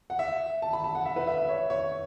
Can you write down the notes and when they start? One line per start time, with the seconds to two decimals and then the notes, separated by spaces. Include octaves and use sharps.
0.10 F#5
0.19 E5
0.62 A5
0.73 B5
0.84 A5
0.95 F#5
1.06 E5
1.16 B4
1.27 E5
1.38 E5
1.49 C#5
1.70 C#5